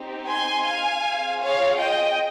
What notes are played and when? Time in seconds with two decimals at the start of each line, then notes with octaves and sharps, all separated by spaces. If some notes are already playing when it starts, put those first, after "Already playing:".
Already playing: C4 D#4 G4
0.27 G#5 C6
0.65 F5 G#5
1.03 C4 F4 G#4
1.40 C#5 F5
1.78 D#5 G5